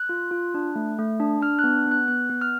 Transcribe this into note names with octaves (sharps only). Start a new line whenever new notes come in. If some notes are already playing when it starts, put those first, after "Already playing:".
Already playing: F#6
F4
F4
D4
A3
A3
D4
D4 F6
B3 F#6
B3
F#6
B3 F#6
B3
F6